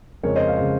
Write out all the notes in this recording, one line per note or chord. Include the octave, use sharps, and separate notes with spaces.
F2 C#3 G#3 A#4 C#5
C5 D#5
F5
C#3 G#3 D#5